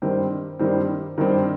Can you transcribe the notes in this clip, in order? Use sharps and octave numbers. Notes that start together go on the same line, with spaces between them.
G2 D#3 G3 C4
G2 D#3 G3 C4
G2 D#3 G3 C4